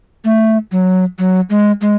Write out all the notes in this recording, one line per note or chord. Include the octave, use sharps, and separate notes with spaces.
A3
F#3
F#3
G#3
G#3